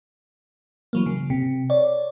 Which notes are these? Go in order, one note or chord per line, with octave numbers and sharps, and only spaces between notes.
E3 F#3 A#3
C#3
C3
C#5 D5